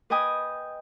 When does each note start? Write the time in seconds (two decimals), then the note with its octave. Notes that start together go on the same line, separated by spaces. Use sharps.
0.10 B4 D#5 G5 G#5 D#6